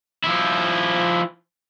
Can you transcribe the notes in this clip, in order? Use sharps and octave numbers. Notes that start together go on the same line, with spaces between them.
F3 E4